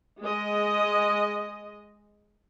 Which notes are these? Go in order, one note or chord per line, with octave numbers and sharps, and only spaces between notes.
G#3 D#5